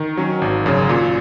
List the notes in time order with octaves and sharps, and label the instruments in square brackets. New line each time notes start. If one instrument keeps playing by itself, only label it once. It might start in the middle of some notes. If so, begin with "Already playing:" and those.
Already playing: [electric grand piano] D#3
F#3 C#4
G#1
F#2 C#3
A#2